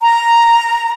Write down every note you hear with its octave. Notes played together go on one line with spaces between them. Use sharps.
A#5